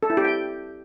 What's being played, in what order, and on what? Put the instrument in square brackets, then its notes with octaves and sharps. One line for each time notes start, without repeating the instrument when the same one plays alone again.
[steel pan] A4
E4
G4
G5